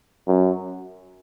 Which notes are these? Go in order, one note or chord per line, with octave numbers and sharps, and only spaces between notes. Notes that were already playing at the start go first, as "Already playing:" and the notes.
F#2